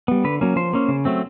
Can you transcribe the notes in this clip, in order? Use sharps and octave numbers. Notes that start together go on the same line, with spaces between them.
G3 B3
D3 B4
F#3 A#3 C#4
F3 C5
A#3 C#4
C#3
F#3 A3 C4